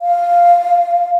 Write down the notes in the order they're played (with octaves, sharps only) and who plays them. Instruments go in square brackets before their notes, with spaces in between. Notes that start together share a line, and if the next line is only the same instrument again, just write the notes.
[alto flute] F5